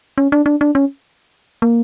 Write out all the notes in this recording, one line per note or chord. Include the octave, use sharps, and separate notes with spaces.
C#4
D4
D4
D4
C#4
A#3